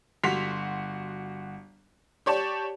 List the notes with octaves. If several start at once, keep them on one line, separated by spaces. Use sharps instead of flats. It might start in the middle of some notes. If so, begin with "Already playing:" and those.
G1 F#4 C6 B6 F7
G4 C#5 D5 A5